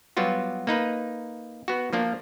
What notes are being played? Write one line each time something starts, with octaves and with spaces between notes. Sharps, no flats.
F#3 G3 B3 F4 F#4
A#3 D#4 B4
B3 F#4
F3 A#3 D4